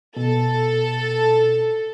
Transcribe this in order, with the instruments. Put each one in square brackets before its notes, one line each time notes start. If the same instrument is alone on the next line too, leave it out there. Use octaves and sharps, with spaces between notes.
[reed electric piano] B2 [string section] A4